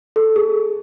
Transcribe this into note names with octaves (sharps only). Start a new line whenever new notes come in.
A4
G#4